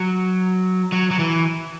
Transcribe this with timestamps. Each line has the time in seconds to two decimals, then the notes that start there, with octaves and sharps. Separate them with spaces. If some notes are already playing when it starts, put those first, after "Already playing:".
Already playing: F#3
0.92 F#3
1.11 F#3
1.19 E3